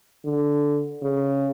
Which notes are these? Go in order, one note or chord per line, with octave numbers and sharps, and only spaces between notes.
D3
C#3